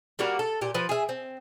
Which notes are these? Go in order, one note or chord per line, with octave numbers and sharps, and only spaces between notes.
G3 A#3 F#4 A#4
A4
A#2 G4
F3 B4
G#4 E5
C4